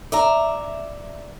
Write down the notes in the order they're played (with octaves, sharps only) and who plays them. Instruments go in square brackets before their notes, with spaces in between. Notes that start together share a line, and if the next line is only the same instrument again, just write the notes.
[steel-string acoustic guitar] D5 E5 A#5